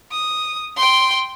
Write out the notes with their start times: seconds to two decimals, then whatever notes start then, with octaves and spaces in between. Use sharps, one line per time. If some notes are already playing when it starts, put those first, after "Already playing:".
0.12 D#6
0.77 G5 C6